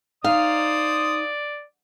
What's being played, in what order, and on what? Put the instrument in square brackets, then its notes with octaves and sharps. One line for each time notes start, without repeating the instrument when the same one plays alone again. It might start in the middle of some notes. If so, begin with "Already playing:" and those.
[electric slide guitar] D#4 [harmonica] C5 D#6 [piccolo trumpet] D5 [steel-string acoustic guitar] F5